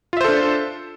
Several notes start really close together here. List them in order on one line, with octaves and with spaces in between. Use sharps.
F4 E5 C5 A4 D4